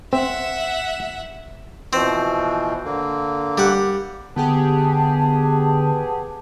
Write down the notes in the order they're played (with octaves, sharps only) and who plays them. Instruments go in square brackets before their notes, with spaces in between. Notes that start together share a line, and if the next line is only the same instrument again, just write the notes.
[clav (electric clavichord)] C4 [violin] E5 F#5
[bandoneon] B2 E3 F3 [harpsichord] C4
[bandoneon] D3 A#3
[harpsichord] G3 F#5
[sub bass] D3 [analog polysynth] B3 G4 G#4 [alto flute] A5